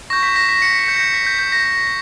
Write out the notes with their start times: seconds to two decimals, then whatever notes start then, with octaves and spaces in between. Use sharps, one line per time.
0.10 C#6 G6 A#6
0.23 B6
0.36 A#6
0.49 B6
0.62 C#7
0.79 B6
0.88 G6
0.96 A#6
1.14 B6
1.27 G6
1.39 G6
1.52 A#6
1.66 B6